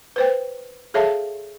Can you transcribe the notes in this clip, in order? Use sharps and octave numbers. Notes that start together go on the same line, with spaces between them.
B4 C5 G5
G#4 A4 C#5 E5 F5 A5